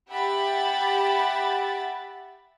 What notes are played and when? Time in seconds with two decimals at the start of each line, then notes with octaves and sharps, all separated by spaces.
0.10 G4 E5 F#5 B5 A6